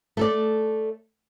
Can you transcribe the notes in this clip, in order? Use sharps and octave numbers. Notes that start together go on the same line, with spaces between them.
A3 A4 D5